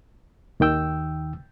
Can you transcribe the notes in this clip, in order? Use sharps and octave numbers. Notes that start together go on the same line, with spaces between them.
D#2 D#3 G5 E6